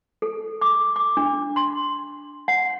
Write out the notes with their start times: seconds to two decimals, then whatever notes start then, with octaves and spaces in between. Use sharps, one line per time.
0.22 A4
0.61 D6
0.96 D6
1.17 D4
1.56 C6
2.48 F#5